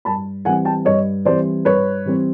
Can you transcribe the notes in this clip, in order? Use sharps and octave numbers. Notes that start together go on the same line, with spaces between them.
G2 A5 B5
E3 G3 C4 F#5 G#5
G5 A5
G2 C#5 D#5
E3 G3 C4 C5 D5
G2 B4 C#5
E3 G3 C4